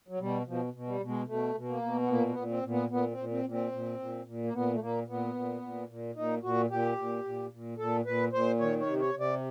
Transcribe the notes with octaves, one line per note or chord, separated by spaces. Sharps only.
F#3
B2 G3
B2 F3
B2
G3
B2
G#3
B2 A3
B2
A#3
B2
B3
A#2 A#3
B3
A#2
C4
A#2
B3
A#2 B3
C4
A#2
C4
A#2
C4
A#2
A#2
A#2
A#3
A#2 B3
A3
A#2 A#3
A#2 B3
A#2
A#2
A#2
A#2 D#4
A#2 F#4
A#2 G4
A#2
A#2
A#2
A#2 A4
A#2 B4
A#2 C5
D#3 C#5
C#5
C3
C#5
C3
D5